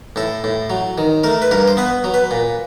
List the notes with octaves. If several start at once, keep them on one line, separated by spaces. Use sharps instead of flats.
A2 A4
A2
F#3
D#3
A3 A#4
B4
G2 A#4
C5
B3 B4
F#3
B4
A#2